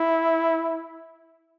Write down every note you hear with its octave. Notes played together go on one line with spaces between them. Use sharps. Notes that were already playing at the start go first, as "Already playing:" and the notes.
Already playing: E4